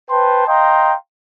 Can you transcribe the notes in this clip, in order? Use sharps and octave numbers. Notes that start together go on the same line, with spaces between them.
B4 C5 G5 A5 C6
D#5 F5 G5 A#5 C6